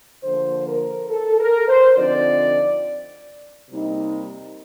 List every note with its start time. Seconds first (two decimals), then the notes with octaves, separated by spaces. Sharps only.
0.24 D3 F3 A#3 C5
0.67 A#4
1.10 A4
1.39 A#4
1.68 C5
1.97 D3 F3 C4 D#4 D5
3.70 C3 G3 A#3 D#4